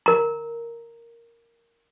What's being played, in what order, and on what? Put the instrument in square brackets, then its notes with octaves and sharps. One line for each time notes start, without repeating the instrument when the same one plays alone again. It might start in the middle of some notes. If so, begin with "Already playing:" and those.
[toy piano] A#4 A#5